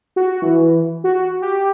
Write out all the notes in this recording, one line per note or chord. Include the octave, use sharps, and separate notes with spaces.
F#4
E3
F#4
G4